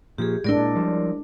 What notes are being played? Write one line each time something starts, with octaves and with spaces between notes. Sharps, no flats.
A#2 F3 G4 G#4
G#1 A2 G#3 D4 E4 A#4 D5
A#2
F3 G3